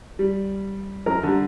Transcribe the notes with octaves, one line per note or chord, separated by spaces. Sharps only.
G3
F#2 A#4
D3 G3